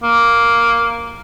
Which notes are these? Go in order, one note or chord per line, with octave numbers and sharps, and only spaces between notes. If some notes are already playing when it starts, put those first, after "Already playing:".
A#3